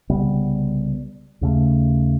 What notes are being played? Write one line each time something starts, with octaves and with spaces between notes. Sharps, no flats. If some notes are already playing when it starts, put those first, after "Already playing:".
C2 C#3 G3 B3
D#2 C#3 A3